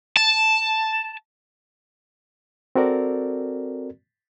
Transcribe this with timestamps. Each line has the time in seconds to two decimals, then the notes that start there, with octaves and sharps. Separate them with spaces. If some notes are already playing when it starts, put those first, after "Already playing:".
0.17 A5
2.75 C4 F#4 A4 A#4 D5